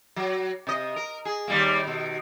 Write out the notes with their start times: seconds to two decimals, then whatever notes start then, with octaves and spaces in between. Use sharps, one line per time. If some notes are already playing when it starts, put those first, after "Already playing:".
0.16 F#3
0.67 C3 D#5
0.96 A#4
1.25 G#4
1.48 D#2 G3 A#3
1.83 B2 D#3